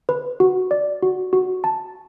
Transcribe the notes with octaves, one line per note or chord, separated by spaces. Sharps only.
B4
F#4
D5
F#4
F#4
A5